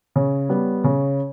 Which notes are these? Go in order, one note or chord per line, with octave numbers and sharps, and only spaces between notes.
C#3 C#5
G3 B3
C#3